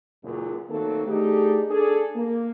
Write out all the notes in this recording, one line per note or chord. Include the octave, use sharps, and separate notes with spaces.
F#1 C#2 F#2 A#2
D#3 F#3 A3 A#3 C4 A4
A3 D4 D#4 G4 G#4
D4 G#4 A4
A#3